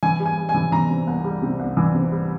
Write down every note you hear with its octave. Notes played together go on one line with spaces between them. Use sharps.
E3 G#5
G3
G#5
G3
G#5
E3
E3 A#5
C3
C2
G3
C3
C2
E3
C3
G3